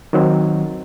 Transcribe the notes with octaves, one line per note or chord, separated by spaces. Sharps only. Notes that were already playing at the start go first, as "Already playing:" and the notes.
D#3 F#3 C4